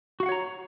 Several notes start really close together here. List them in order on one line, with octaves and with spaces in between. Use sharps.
F#4 F5 F#5 C#5 A#5